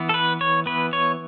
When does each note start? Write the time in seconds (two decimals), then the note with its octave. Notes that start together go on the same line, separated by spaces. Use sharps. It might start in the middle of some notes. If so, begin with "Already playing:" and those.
Already playing: E3 B3
0.09 A4
0.14 B4
0.41 C#5
0.66 E3 B3 B4
0.93 C#5